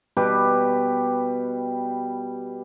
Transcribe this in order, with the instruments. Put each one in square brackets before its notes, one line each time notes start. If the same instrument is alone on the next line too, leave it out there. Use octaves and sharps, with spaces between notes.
[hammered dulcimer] B2 G3 G4 B4